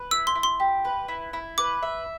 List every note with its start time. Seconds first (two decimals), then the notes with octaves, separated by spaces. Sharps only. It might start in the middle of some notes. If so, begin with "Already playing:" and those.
Already playing: B4
0.11 E4 E6
0.27 C6
0.35 E4
0.43 C6
0.60 G4
0.85 B4
1.08 E4
1.33 E4
1.58 B4 D6
1.83 E5